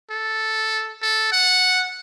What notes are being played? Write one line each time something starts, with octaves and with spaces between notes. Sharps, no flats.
A4
A4
F#5